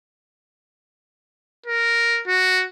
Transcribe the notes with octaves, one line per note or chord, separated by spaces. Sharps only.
A#4
F#4